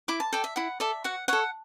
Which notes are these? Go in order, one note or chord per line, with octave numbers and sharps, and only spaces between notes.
E4 D6
A5
A4 D5 G5
E5
E4 F#5
A4 D5 E5
F#4 F#5
A4 C#5 F#5